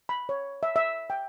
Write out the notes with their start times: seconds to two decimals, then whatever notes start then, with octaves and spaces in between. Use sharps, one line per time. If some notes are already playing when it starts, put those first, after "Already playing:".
0.09 B5
0.29 C#5
0.63 E5
0.76 E5
1.10 G5